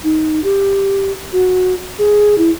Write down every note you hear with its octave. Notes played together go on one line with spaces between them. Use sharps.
D#4
G4
F#4
G#4
E4